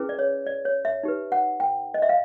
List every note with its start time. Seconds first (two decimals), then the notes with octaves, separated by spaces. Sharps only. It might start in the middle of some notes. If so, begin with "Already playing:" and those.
Already playing: C#4 E4 G#4 B4
0.09 D5
0.19 C#5
0.46 D5
0.65 C#5
0.85 E5
1.03 D#4 G4 B4
1.32 F#5
1.60 G5
1.94 D#5
2.02 E5
2.09 F5